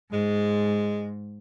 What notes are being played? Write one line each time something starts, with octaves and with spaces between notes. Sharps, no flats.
G#2 G#3